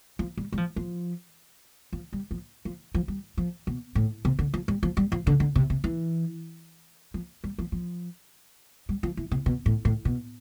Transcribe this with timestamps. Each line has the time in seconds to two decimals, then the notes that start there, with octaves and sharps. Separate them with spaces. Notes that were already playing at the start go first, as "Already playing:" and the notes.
0.19 F3
0.37 G3
0.52 G3
0.57 F3
0.76 F3
1.93 F3
2.13 G3
2.31 F3
2.65 F3
2.94 F3
3.08 G3
3.37 F3
3.67 B2
3.95 A2
4.25 C3
4.39 D3
4.54 F3
4.68 G3
4.83 F3
4.97 G3
5.12 F3
5.27 D3
5.40 D3
5.55 C3
5.70 C3
5.84 E3
7.14 F3
7.44 G3
7.58 F3
7.72 F3
8.89 G3
9.03 F3
9.17 E3
9.31 C3
9.46 B2
9.66 A2
9.85 A2
10.05 B2